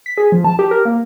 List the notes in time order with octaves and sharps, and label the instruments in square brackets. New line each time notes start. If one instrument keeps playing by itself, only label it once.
[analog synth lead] B6
G#4
F3
A5
G4
A#4
A#3